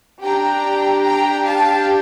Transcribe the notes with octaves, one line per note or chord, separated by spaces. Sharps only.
D4 G4 G5 A#5
G5 A#5
F5 A5